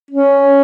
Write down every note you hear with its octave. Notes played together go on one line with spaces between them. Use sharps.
C#4